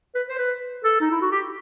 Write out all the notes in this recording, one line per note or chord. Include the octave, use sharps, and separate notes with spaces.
B4
C5
B4
A4
D#4
E4
F#4
G4